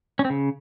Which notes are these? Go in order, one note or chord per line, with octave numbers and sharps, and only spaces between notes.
C#4
C4
C#3